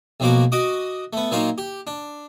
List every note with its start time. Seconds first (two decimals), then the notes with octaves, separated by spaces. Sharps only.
0.20 B1 B2 F3 A#3 F#4 D6
0.52 F#4 D#5 D6 D#6
1.13 A3 B3
1.31 A#2 F#3 A#3 D#4 F4 F5
1.58 G4
1.87 D4